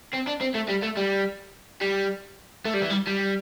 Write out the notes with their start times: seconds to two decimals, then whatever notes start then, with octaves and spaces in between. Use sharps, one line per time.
0.13 C4
0.27 D4
0.41 C4
0.55 A3
0.70 G3
0.83 A3
0.97 G3
1.81 G3
2.65 A3
2.74 G3
2.82 E3
2.90 G3
3.07 G3